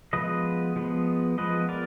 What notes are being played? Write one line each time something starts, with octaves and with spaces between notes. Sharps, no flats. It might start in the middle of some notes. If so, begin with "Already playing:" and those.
F3 G#3 B3 B4 D#5
F3 G#3 B3
F3 G#3 B3 B4 D#5
A#4 D5